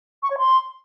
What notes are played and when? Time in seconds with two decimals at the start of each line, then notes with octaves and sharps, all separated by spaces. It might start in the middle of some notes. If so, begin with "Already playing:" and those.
0.23 C#6
0.31 C#5
0.38 C6